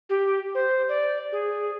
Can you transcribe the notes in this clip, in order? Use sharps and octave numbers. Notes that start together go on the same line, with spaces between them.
G4
C5
D5
G#4